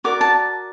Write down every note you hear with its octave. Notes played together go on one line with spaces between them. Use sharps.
F#4 A#4 D5 D6
A5